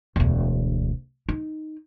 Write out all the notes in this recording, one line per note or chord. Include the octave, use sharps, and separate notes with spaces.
E1 D2
D#4